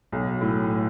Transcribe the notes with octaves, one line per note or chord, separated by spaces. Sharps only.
B1
A2